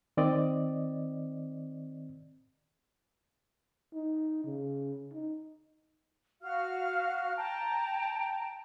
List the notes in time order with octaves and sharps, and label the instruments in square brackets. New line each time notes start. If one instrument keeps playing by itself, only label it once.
[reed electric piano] D#3 C4 D5 D#5
[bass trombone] D#4
C#3
D#4
[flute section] F#4 F5 F6
G5 A5 A#5